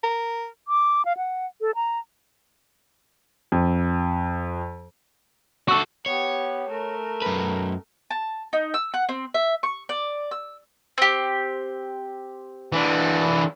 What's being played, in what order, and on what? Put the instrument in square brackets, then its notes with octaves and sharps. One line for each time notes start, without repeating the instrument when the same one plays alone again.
[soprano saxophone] A#4
[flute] D6
F5
F#5
A4
A#5
[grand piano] F2
[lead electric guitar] F#4 A4 [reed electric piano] C#6 E6
[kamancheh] B3 G4 [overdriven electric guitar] C#5
[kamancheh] A3 A#4
[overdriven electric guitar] F#2 B4
[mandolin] A5
D#4
E6
F#5
C4
E5
C#6
D5
E6
C4 G4
[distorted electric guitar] E3 D4